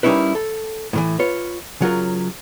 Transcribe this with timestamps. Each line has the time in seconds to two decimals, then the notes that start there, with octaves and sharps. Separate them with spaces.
0.03 G3 A#3 C#4 D#4 E4 B4
0.35 A4
0.93 A2 C#3 E3
1.19 F4 B4 C#5
1.81 C#3 F#3 F4 A#4